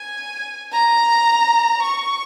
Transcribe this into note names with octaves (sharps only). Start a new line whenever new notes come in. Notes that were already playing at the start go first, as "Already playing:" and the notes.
Already playing: G#5
A#5
C#6